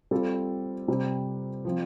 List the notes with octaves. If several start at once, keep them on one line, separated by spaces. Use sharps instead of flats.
G3 C4 F4 A4
C3 G3 C4
F3 C4 F4